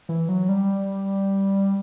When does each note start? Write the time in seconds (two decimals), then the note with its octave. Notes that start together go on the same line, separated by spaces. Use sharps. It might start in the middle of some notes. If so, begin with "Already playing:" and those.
0.09 E3
0.29 F#3
0.49 G3